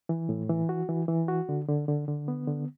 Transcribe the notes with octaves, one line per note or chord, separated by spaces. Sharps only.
E3
A2
E3
F#4
E3
E3
F#4
D3
D3
D3
D3
B3
D3